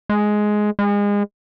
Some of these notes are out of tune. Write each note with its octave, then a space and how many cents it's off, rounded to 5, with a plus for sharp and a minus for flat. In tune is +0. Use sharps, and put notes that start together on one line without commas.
G#3 +10
G#3 -30